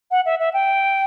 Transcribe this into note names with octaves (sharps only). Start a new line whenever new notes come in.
F#5
E5
E5
G5